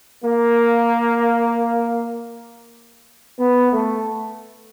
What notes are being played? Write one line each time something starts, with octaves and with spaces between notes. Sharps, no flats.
A#3
B3
A3